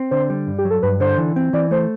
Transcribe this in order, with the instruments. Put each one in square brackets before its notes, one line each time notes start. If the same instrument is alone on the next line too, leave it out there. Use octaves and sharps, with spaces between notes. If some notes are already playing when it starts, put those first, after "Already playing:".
Already playing: [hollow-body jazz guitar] C4
[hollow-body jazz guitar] D3 [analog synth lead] C5
[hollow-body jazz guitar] G3
G2
[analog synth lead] G4
[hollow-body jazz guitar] F#3
[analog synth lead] A4
[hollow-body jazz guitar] G2 [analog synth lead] B4
[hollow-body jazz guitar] D3 [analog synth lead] C5
[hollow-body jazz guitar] E3
C4
[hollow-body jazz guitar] E3 [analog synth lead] D5
[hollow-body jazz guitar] A3 [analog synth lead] C5